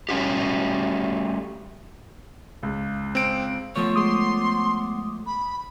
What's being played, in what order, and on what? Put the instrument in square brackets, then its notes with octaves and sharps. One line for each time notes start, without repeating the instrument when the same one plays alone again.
[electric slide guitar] G3 A3 C#4 F#4 G4
[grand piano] C#2
[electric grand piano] C4 D7
[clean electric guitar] F3 A3 C#5 [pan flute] B3
[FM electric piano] G#3 D6 D#6 [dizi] C6
[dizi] B5